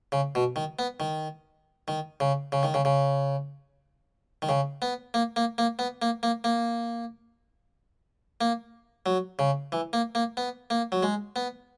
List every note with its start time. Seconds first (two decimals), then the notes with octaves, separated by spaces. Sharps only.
0.12 C#3
0.35 B2
0.56 D#3
0.79 B3
1.00 D#3
1.88 D#3
2.20 C#3
2.52 C#3
2.63 D#3
2.74 C#3
2.85 C#3
4.42 D#3
4.49 C#3
4.82 B3
5.14 A#3
5.36 A#3
5.58 A#3
5.79 B3
6.02 A#3
6.23 A#3
6.44 A#3
8.41 A#3
9.06 F#3
9.39 C#3
9.72 E3
9.93 A#3
10.15 A#3
10.37 B3
10.70 A#3
10.92 F#3
11.03 G#3
11.36 B3